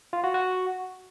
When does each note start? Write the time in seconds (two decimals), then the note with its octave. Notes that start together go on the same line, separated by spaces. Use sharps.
0.13 F4
0.24 F#4
0.34 F#4